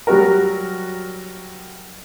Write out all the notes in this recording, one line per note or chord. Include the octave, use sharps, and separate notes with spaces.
F#3 G3 F#4 A#4